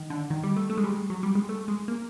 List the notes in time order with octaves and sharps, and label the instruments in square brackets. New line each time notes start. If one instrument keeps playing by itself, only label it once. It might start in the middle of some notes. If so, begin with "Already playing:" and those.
Already playing: [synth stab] D#3
D3
D#3
G3
A3
A3
G#3
G3
G#3
F#3
G3
G#3
A3
G#3
A#3